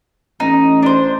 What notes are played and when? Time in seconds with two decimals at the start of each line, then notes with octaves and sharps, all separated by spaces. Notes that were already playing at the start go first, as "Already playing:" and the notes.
0.40 A1 D#4
0.82 D4 C5